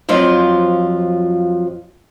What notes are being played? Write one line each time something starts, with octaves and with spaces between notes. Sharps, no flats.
F2 F3 F#3 F4